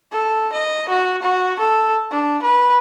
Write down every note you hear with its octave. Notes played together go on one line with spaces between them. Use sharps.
A4
D#5
F#4
F#4
A4
D4
B4